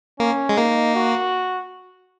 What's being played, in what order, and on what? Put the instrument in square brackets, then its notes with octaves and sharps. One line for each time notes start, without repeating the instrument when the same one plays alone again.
[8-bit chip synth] A#3 [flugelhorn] C#4
[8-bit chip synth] G#3
[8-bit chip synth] A#3 [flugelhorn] D#4
[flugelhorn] F#4